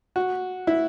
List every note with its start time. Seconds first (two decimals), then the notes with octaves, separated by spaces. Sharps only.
0.16 F#4
0.67 E4